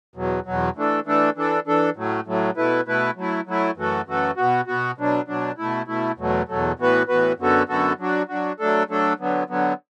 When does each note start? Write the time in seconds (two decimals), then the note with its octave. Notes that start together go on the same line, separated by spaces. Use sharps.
0.16 E2 B2 F#3
0.46 E2 B2 F#3
0.76 E3 A3 D4 A4
1.06 E3 A3 D4 A4
1.36 E3 D4 A4
1.67 E3 D4 A4
1.96 A2 F#3 A3
2.26 A2 F#3 A3
2.57 B2 A3 E4 B4
2.86 B2 A3 E4 B4
3.17 F#3 A3 E4
3.47 F#3 A3 E4
3.77 F#2 E3 A3 F#4 A4
4.07 F#2 E3 A3 F#4 A4
4.37 B2 B3 F#4
4.67 B2 B3 F#4
4.98 B2 F#3 D4
5.28 B2 F#3 D4
5.58 B2 A3 E4
5.88 B2 A3 E4
6.18 E2 B2 F#3 A3
6.48 E2 B2 F#3 A3
6.79 A2 E3 B3 F#4 B4
7.08 A2 E3 B3 F#4 B4
7.38 F#2 D3 B3 F#4 A4
7.69 F#2 D3 B3 F#4 A4
7.99 F#3 D4 F#4
8.29 F#3 D4 F#4
8.59 F#3 A3 D4 A4
8.89 F#3 A3 D4 A4
9.19 D3 F#3 B3
9.49 D3 F#3 B3